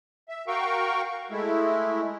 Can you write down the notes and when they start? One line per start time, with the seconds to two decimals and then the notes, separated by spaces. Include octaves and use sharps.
0.29 E5
0.48 F#4 A#4 F5 G5 C#6
1.31 G#3 A3 E4